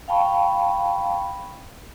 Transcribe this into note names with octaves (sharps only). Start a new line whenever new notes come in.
F5 G5 A5 B5 C#6